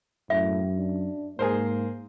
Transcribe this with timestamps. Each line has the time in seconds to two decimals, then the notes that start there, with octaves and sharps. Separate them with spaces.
0.30 F#2 A2 E5
0.78 D4
1.39 G#2 A#3 G#4 A#4 C5